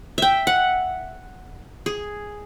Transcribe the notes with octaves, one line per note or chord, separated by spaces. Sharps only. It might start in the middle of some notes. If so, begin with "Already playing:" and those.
E5 G5
F#5
G#4